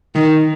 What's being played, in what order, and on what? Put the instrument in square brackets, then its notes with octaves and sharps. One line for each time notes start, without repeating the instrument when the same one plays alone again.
[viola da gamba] D#3